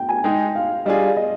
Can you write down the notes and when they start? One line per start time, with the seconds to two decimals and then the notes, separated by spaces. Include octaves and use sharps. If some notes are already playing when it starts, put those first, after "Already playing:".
Already playing: G5
0.09 G#5
0.24 G#3 D#4 G#4 G5
0.55 F5
0.85 G3 D4 F4 G#4 D#5
1.16 D#5